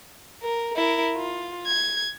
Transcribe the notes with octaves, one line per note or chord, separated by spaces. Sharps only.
A#4
E4 A#4
F4
G#6